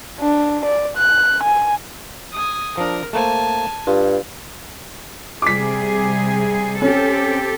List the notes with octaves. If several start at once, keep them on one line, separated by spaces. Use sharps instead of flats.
D4
D5
F#6
G#5
G#5 D#6
F3 D4 A#4
A3 A#3 C5 G#5 A5
G2 F4
C3 G3 G#4 D6 B6
C4 C#4 G4 A4